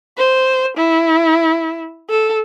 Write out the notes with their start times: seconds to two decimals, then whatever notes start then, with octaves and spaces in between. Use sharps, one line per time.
0.18 C5
0.77 E4
2.10 A4